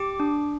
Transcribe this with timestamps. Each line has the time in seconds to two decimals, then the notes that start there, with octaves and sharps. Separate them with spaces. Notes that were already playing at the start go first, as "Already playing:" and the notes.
Already playing: G4 D6
0.20 D4